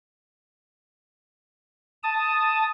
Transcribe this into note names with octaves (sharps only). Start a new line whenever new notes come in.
A5 D#6